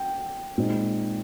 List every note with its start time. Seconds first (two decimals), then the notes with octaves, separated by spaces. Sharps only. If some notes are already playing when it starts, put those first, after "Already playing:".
Already playing: G5
0.58 A#2 G#3 C4 D#4